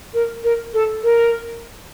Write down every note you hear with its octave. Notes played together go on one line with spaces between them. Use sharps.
A#4
A#4
A4
A#4